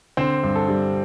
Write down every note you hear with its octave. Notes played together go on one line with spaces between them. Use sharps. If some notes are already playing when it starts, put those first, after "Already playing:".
D3 C4 C5
G2
A4
G3